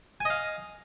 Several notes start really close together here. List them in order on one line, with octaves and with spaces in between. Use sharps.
G#5 D#5 F5